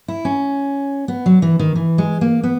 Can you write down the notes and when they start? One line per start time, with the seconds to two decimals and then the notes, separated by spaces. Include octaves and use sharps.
0.08 E4
0.25 C#4
1.08 B3
1.26 F#3
1.42 E3
1.59 D#3
1.76 E3
1.98 G#3
2.21 A#3
2.43 B3